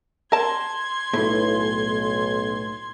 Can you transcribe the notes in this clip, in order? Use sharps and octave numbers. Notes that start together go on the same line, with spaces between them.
A#4 A5 C6 G#6
B1 A2